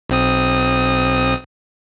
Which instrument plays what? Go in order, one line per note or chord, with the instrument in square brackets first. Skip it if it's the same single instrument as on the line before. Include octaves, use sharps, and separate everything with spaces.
[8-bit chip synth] B1 C4 D#6